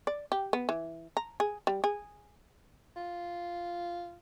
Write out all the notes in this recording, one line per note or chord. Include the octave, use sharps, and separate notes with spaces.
D5
G4
B3
E3
A#5
G#4
G3
G#4
F4